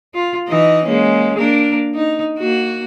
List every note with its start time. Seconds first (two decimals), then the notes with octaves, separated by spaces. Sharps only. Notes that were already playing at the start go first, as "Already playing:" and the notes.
0.14 F4
0.49 E3 D#4 D#5
0.85 G#3 A#3 C#4
1.37 A#3 D4 A#4
1.95 D#4
2.38 A#3 F#4